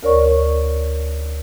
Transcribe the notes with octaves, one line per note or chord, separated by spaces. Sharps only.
D2 A#4 C#5 D5 C#6